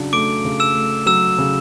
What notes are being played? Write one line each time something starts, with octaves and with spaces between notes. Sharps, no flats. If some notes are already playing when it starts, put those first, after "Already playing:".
Already playing: C#3 F#3 D4
A3 D6 D7
C#3
E6 E7
A3
F#3 E6 E7
C#3